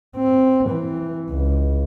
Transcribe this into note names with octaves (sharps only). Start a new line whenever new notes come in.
C4
E3
C#2